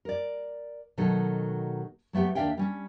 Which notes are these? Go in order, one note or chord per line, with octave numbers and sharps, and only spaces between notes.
A#4 D5
B2 D#3 F#3 A3 F#4 A4
F#3 A3 B3 G4
D#2 D4 D5 E5 F5 G5
G3 C#4